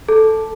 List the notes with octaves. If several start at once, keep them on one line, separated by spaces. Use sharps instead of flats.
A4